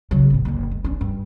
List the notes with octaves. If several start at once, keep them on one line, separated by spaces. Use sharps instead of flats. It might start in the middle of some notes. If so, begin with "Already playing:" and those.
C#3 F#3
G#1 A2
F#1 D3
G#3
C#4 D4
G2